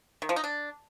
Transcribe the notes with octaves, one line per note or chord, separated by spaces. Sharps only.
D#3
F3
D#4
D4